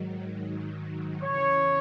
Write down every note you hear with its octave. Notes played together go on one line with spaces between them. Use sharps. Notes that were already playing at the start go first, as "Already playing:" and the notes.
Already playing: G#2 D#3 F#3
E2 C#3 E3 C#5